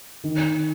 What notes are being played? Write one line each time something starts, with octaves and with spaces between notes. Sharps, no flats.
D#3